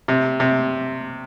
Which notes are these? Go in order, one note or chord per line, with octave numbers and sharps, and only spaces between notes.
C3
C3